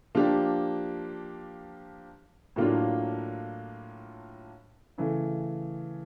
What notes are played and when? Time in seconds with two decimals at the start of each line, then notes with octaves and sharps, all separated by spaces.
0.15 F3 A#3 D4 G4
2.56 A2 F#3 A#3 D4 F4
4.98 C#3 E3 A3